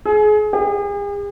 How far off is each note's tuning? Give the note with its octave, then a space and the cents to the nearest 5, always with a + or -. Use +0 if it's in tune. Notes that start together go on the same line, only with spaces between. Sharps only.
G#4 +30
G#4 -45